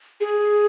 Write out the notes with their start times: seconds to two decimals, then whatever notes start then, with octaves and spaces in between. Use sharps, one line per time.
0.21 G#4